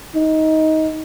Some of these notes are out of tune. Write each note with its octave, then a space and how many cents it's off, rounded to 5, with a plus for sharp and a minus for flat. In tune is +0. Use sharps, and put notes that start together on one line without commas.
D#4 +15